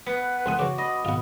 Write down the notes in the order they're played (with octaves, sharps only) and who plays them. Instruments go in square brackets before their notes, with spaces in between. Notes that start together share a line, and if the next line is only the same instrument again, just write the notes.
[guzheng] B3 [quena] B4
[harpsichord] C2 E3 D#6 [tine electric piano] F#5 C6
[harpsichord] C#3 E3 [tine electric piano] F#4 D6
[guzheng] D#5 [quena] B5
[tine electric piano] G#1 B2 [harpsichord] F4 F#5